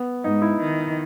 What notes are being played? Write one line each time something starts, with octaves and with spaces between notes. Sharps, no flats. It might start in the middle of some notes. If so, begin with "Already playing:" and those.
Already playing: B3
G#2 D#4
E4
D#3